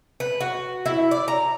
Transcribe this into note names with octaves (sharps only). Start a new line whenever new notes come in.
B4
F#4
E4
D5
A#5